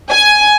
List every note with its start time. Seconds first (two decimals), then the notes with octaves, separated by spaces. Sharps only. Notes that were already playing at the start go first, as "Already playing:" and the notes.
0.10 G#5